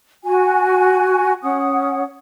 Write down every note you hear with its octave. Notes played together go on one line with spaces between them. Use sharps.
F#4 G#5
C#4 F#5 D#6